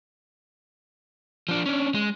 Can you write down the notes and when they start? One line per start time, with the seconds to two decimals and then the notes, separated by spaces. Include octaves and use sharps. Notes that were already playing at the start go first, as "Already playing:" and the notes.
1.48 F3 D4
1.66 C#4 D4
1.95 G#3